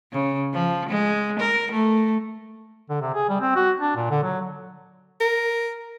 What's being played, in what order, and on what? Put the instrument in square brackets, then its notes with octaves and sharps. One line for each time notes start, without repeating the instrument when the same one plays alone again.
[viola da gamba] C#3
F3
G#3
A#4
A3
[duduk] D3
C3
G#4
G3
C4
F#4
D4
A#2
D3
F#3
[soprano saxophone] A#4